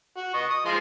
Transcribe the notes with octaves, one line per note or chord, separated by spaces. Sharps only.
F#4
D#5 C#6
D#6
F3 G#3 C6